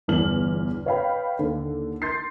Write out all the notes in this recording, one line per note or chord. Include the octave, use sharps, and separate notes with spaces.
G1 E2 F6 F#7
B4 C#5 D#5 F5 G5 B5
D#2 D3
C6 G6 A6 C7